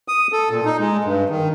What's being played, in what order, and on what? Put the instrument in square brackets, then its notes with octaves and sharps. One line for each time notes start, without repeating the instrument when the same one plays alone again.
[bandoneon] D#6
A4
A#2
D#4
G#3
G2
D#3